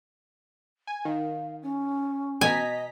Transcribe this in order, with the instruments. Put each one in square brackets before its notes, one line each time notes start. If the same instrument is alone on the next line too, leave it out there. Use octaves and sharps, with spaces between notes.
[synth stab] G#5
[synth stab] D#3 [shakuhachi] F5
[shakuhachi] C#4
[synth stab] B2 A#5 B6 [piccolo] D#5 [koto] G#5